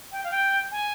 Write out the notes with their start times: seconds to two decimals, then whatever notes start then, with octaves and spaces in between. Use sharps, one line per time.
0.12 G5
0.24 F5
0.31 G5
0.72 G#5